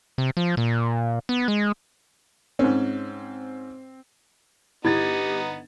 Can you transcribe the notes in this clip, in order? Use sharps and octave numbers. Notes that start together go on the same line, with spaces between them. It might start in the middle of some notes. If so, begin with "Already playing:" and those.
C3
F3
A#2
B3
G#3
G#2 C4 C#4
G1 B3 D#4 E4 G4 G#6 A6